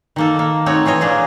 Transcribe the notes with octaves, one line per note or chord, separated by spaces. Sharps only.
D#3 A#3 A4
A#3
A3 C4 D#4 F#4 C#5
E3 F4 C#5 D#5
A#2 A#3 D4 G#4